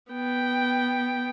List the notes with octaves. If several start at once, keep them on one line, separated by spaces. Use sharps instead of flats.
B3 G5